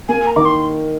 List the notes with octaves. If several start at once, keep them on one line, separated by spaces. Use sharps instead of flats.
A#3 G#5
A#5
D#3 D6
C6